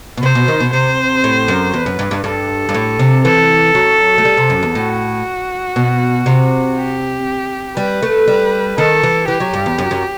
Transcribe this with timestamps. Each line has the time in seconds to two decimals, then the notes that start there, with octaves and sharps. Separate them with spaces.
0.17 B2
0.22 C3 C5
0.35 B2
0.48 D#3
0.60 B2
0.73 C3 C5
1.24 A2
1.48 F#2
1.73 E2 B4
1.86 F#2
1.99 G2
2.11 G2
2.24 G2 A4
2.69 G2
2.74 A2
2.99 C3
3.24 E3 A4
3.75 F#3
4.18 A3
4.25 G3
4.37 C3
4.50 F#2
4.63 E2
4.75 A2 F#4
5.76 B2
6.26 C3
6.77 G4
7.77 G3 B4
8.03 A3
8.28 G3
8.78 D#3 A4
9.03 E3
9.28 E3 G4
9.40 F#3
9.54 G2
9.66 E2
9.78 F#2
9.91 F#2